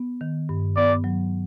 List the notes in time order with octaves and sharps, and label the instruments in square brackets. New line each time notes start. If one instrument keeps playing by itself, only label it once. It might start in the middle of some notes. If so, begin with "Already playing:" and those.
Already playing: [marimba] B3
D#3
G2
[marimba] B3 [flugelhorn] D5
[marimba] F#3